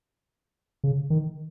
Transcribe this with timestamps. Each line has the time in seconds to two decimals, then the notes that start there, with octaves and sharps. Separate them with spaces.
0.84 C#3
1.10 D#3